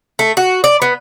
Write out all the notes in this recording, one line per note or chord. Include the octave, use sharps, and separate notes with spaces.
A3
F#4
D5
B3